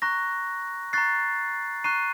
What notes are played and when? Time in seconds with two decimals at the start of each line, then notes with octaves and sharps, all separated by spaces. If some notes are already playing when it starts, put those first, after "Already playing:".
0.02 A#5 C#6 F#6 A#6
0.93 A#5 C#6 F#6 A6 C7
1.84 A#5 C#6 F#6 C7 D#7